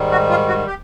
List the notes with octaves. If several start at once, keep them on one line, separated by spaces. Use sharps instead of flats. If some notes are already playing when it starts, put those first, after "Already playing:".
Already playing: G#2 D#3 G3
F#4
F4
F#4
G4